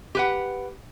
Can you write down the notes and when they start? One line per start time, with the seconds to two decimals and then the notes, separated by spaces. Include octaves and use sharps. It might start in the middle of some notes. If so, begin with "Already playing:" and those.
0.15 G4 B4 F#5